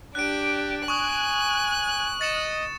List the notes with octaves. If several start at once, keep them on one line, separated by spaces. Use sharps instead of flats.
D4 G4 F#6 D7
G#5 C#6 D#6 F#6
D#5 A6 C#7 E7